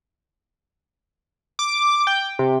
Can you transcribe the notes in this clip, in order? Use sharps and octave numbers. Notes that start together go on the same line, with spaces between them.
D6
D6
G5
C3